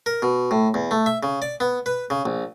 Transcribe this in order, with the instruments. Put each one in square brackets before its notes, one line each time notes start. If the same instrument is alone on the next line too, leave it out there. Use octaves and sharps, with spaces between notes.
[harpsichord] A#4
B2
A2
E2
A3
E5
C#3
D5
B3
B4
C#3
A#1